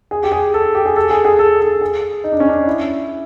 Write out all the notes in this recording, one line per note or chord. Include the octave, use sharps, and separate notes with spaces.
G#4
G4
G#4
A4
G4
G#4
A4
G#4
G#4
A4
A4
G#4
D#4
D4
C#4
D4
E4